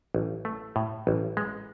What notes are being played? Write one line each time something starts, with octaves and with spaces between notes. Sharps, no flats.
A1
A3
A2
A1
G#3